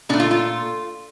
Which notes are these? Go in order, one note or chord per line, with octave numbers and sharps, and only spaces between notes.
A#2 A3 D4
F4
F4